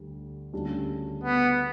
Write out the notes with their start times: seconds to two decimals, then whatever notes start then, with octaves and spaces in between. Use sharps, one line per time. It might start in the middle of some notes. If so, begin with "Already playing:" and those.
Already playing: D2 G3
0.53 D2 C#3 G3 D4
1.23 B3